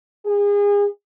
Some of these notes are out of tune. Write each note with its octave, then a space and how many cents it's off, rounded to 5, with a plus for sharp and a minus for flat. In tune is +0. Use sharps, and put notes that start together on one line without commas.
G#4 -35